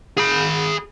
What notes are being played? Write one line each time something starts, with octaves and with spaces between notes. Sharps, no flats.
G#4 B5